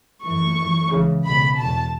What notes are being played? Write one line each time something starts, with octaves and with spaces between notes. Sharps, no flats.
F#2 E3 C#6
F#2 E3
C#2 C#3 E3
C#2 B2 B5
E2 B2 A5